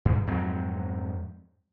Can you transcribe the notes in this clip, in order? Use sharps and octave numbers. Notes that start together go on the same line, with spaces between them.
G2
F2 G#2 F#3 C4